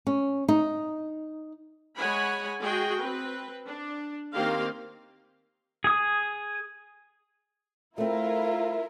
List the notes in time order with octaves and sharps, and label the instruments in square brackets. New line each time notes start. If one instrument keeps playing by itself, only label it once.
[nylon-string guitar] C#4
D#4
[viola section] G#3 C#5 F#5 G#5 B5
G#3 F#4 G#4 D#5 G5
C4 B4
D4
D#3 A#3 C4 G4 F5 C6
[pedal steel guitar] G#4 D#6
[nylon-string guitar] A3 C4 [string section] E4 F4 A#4 [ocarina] E5